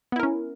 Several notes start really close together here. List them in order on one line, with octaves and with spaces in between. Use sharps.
B3 E4 A#4 C#4